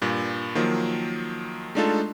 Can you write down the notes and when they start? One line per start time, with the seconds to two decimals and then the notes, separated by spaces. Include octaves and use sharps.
0.02 G2 A#2
0.55 D#3 F3 F#3 A#3
1.75 G#3 A3 D4 D#4 F4 A4